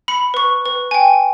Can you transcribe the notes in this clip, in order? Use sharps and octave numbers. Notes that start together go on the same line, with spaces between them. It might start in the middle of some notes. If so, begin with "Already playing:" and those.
B5 C#7
B4 C#6
B4
G5 G#5